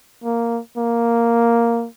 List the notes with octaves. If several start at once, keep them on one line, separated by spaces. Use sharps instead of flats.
A#3
A#3